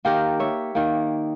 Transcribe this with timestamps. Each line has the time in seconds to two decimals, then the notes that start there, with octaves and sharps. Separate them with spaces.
0.05 D#3 A#3 G4 A#4
0.40 C#5 E5
0.75 D#3 A#3